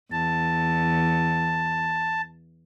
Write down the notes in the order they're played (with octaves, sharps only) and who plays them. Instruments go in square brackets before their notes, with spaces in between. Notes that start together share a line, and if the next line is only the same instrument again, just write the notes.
[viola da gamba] E2 [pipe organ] A5